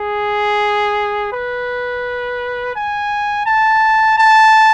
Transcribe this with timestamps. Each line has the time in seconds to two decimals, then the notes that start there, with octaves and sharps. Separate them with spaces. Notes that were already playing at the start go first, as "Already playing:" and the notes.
Already playing: G#4
1.32 B4
2.75 G#5
3.46 A5
4.18 A5